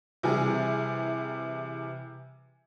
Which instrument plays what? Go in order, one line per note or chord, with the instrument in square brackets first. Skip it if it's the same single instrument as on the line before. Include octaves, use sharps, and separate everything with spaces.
[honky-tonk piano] C3 E3 G3 G#4